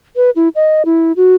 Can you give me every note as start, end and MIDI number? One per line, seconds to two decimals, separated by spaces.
0.16 0.30 71
0.36 0.48 64
0.55 0.82 75
0.85 1.12 64
1.16 1.35 66